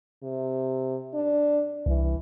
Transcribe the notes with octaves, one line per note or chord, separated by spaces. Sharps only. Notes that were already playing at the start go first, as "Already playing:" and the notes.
C3
D4
C2 E3